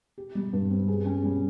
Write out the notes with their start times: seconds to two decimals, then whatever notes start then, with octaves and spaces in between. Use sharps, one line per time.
0.18 G4
0.35 G3
0.53 G2
0.70 C4
0.88 G#4
1.06 C#4
1.24 G3